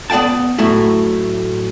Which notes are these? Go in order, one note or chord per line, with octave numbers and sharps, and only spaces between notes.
B3 D5 F5 G5 A5
A2 F#3 A3 E4